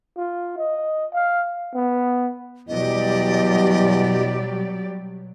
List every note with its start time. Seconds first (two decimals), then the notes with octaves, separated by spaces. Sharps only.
0.17 F4
0.57 D#5
1.13 F5
1.75 B3
2.68 E2 B2 F#3 G3 G4 D5 D#5